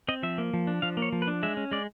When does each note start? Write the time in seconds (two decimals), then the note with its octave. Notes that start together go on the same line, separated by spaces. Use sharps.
0.08 C4 D#5
0.23 F3 E5
0.38 A#3
0.54 F3
0.67 D4
0.82 F3 F5
0.97 A#3
1.02 C#5
1.13 F3
1.22 B4
1.28 D4
1.43 G#3 E5
1.57 C#4
1.71 G#3 D5